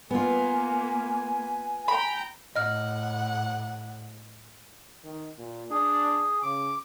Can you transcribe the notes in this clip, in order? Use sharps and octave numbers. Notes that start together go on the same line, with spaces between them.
A#3 B3 F4 G#5
G5 A#5 B5
A2 D#5 F#5 F6
D#3
A#2
D4 G#4
C#3 D6